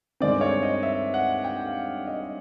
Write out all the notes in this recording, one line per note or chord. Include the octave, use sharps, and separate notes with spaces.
G2 D#3 G#3 C4 D5
C#5
D#5
E5
F#5
G5
F5
D#5